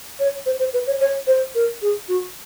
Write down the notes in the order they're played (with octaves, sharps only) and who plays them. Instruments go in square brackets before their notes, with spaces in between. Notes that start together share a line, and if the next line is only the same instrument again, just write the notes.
[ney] C#5
C5
C5
B4
C#5
C#5
C5
A#4
G#4
F#4